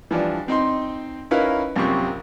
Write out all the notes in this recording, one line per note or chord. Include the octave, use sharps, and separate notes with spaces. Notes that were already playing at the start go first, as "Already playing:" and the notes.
E3 F3 G3 D4
C4 D#4 G5 C6
C#4 D#4 E4 A#4 B4 F5
A#1 F#2 C3 C4 G4 C#6